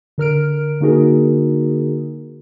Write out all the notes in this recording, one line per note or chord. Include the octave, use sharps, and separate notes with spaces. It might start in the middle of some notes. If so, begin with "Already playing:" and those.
D3 A#4 F6 D7
D3 A#3 D#4 F#4 G#4 A#4